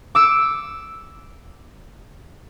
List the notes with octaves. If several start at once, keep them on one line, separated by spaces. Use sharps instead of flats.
D6 E6 C#7